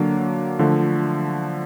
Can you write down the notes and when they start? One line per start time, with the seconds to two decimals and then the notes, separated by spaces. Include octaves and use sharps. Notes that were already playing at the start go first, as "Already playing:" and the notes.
Already playing: D3 F#3 A#3 D4
0.59 D3 F3 A3